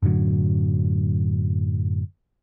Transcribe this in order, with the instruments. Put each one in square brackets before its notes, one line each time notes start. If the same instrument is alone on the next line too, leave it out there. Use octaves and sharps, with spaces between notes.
[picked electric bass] F#2 A2 D3 F#3